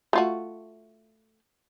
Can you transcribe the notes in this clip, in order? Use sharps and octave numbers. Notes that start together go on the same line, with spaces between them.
A3 F4 F#4